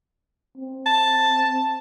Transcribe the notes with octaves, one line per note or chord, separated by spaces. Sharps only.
C4
A5